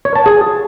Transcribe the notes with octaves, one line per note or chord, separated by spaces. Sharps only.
C#5
A5
G#4